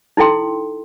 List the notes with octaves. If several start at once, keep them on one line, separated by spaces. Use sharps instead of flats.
D#4 E4 A4 G5 C6